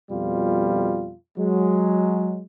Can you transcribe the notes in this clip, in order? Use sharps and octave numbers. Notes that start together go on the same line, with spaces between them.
F2 B2 G3 F4
F#3 G#3